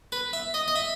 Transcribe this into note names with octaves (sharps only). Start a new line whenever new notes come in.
B4
E5
D#5
D#5
E5